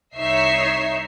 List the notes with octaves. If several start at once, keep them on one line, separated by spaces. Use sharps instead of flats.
C2 D#4 C#5 E5 C7